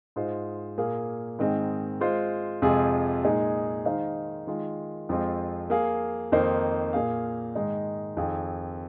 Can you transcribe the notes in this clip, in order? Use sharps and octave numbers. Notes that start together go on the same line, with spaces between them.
G#2 G#3 F4 C5
A#2 A#3 G#4 F5
G#2 D#3 C4 G#4 D#5
G#3 F4 C5
F2 C3 G#3 F4 G#4
A#2 G#3 D#4 G#4
D#3 G#3 D#4 C5 F5
D#3 G#3 F4
F2 F3 G#3 C4 F4
A#3 G#4 F5
F2 D#3 A#3 D#4 C5
A#2 A#3 G#4 F5
G#2 D#3 G#3 D#4
F2 D#3 C4 G#4 F5